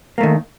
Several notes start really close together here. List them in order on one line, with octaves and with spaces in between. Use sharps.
A#3 A3 D#3